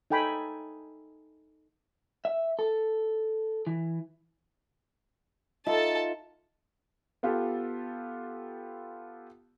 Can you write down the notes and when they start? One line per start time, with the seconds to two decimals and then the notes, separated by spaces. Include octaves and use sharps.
0.10 D#4 A4 G5 G#5 B5
2.25 E5
2.59 A4
3.67 E3
5.66 D#4 F4 A4 E5 A5
7.23 B3 F4 G4 A4